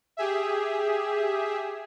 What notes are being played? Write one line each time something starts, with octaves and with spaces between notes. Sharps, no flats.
G4 G#4 E5